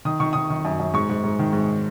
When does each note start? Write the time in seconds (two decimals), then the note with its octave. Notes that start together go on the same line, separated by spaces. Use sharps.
0.05 D#3 D#6
0.20 D#3 C#6
0.33 D#3 D#6
0.50 D#3
0.65 F#2
0.80 F#2
0.94 G#2 C#6
1.10 G#2
1.24 G#2
1.39 D#3
1.53 G#2